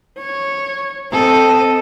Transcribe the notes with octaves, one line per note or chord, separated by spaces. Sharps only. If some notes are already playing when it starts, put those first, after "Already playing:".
C#5
C4 A4 D#5